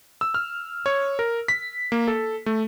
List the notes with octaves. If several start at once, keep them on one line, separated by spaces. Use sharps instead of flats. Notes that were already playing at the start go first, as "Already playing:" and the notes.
E6
F6
C#5
A#4
B6
A#3
A4
A3